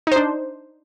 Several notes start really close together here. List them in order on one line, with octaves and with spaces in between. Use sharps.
D#4 C5 D4